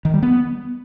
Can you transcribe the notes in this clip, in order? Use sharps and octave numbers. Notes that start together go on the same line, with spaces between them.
D#3
G3
B3